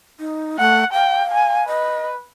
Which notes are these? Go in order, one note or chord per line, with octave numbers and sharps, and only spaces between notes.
D#4
A3 F#5
F5 G5
G#5
B4 D#5